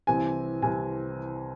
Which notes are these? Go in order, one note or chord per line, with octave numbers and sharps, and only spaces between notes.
C2 C3 E3 C4 G#5
C2 C3 E3 C4 G#5